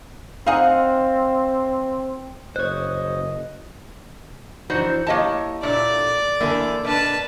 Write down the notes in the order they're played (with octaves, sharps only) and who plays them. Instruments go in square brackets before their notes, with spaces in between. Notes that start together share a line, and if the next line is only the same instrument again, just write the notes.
[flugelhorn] C4 [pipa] D#4 G#4 F#5 [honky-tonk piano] F5
[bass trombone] F#1 [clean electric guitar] C5 C#5 [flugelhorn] D#5 [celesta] F#6
[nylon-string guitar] E3 D4 [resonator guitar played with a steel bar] D#4 F#4 C5
[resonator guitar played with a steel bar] A#3 D#5 A5 [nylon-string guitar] E4 G4 C#5
[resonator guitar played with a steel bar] A#2 A3 D4 [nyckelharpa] D5
[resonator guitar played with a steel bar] D3 E3 A3 [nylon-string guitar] A#3 A4
[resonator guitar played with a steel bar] B2 D4 [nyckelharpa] B4 A5